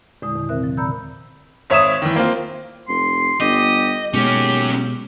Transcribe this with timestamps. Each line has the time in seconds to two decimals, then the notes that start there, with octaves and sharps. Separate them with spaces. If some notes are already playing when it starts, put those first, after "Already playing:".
0.22 E2 A#2 D3 G#3 E4 D#6
0.36 E2 D#3
0.49 C3 C4 A#4 E5 F#6
0.64 F3
0.77 A#2 D3 A#5 B5 E6 G6
1.70 G#1 C#5 E5 D#6 E7
2.02 D#3 E3
2.16 A#3 C4 F4
2.88 F1 C6
3.40 G1 G4 D#5
4.14 D#2 B2 G#3 C#4 F#4 G4